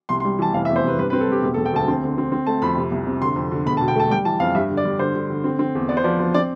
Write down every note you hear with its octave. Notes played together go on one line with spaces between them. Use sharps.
C2 C6
C6
G3
E3 A5
F1 F5
E5
E2
C5
C3 B4
G2 B4
B4
C4
A4
G2 G4
E1 G4
A4
E1
G5
D2 A5
C4
D3
C4
C4
A3 A5
F2 B5
C3
C2
C3
D3 C6
F2
D3
E1 B5
A5
B2
G5
A3 A5
G3 G5
E3 A5
F2 F5
G2 E5
D3
D5
G2
D3 C5
D3
D3
C4
C4
E2
B3 D5
C5
F3 D5
F3
C4 D5